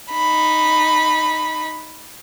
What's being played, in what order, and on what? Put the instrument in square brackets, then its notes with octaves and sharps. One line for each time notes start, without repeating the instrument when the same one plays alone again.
[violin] D#4 B5